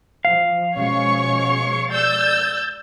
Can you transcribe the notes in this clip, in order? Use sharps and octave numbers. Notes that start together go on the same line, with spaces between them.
F3 F5
B2 F3 G#3 C#4 C#5 C#6
D5 E6 G6 A6